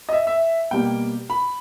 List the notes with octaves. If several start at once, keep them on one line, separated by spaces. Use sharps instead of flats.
D#5
E5
E5
B2 G3 A#3 G5
B5